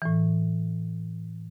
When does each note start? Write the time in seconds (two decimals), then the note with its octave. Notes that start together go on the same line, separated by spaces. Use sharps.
0.02 A2 E3